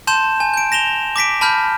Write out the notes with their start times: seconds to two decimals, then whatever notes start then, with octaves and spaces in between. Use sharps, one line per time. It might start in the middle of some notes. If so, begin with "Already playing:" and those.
0.07 A5 C6 G6 E7
0.40 G#5
0.54 G6 D7
0.72 A#6 E7 F7 G7
1.16 D6 A#6 B6 D7
1.41 A5 B5 F6 G6